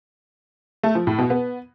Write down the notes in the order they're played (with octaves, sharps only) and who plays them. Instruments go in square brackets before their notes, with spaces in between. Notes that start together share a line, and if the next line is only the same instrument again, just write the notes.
[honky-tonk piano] A3
F3
A2
B2
B3